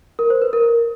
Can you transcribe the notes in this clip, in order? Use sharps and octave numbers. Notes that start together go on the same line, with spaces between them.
A#4
C5
B4
A#4